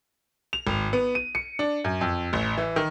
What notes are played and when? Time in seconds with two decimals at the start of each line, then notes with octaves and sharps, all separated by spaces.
0.53 F7
0.67 G#1
0.93 B3
1.15 D#7
1.35 C#7
1.59 D4
1.84 F#2
2.01 F2
2.33 A1
2.57 E3
2.76 D#3